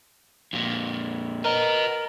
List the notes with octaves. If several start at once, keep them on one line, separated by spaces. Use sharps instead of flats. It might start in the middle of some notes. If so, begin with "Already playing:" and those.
F2 A#2
A#4 B4 D#5